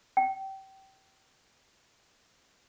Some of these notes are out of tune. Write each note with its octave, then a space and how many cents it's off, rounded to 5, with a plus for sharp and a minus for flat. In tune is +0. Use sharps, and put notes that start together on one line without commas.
G5 -25